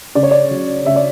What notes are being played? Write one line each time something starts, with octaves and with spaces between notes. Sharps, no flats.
C#3 D5
C#5
D5
F#3
C#3 E5
D5